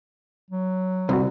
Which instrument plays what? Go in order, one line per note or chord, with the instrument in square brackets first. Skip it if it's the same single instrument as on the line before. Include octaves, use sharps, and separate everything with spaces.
[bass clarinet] F#3
[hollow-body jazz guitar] C2 [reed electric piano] C4 F#4